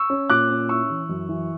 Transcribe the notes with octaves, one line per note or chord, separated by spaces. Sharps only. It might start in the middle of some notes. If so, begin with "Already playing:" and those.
Already playing: C#6 E6
C#4
A#2 D6 F#6
C#4
E4 C#6 E6
E3
F#2
E3